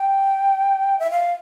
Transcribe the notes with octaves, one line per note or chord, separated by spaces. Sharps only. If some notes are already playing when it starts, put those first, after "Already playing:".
Already playing: G5
E5
F5